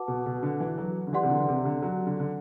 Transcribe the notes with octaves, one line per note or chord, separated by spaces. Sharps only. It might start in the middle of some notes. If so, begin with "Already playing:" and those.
Already playing: F#4 B4 F#5 A5 D6
B2
B2
D3
E3
F#3
D3
E3 G4 D5 F#5 C6
C3
D3
D3
C3
D3
F#3
D3
D3